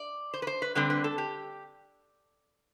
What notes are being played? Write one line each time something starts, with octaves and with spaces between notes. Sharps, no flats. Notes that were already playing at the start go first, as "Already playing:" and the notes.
Already playing: D5
C5
B4
C5
B4
D3 G3 C4 B4
B4
A4
G4